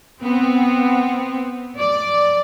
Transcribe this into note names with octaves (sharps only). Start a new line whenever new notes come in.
B3 C4
D5